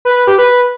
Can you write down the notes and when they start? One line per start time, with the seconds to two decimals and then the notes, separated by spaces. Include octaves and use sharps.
0.05 B4
0.16 B4
0.27 G4
0.38 B4